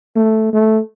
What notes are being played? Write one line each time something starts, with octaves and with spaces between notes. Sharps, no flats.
A3
A3